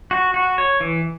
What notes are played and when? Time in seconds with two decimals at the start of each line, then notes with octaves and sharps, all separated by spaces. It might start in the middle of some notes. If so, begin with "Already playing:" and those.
0.11 F#4
0.34 F#4
0.58 C#5
0.81 E3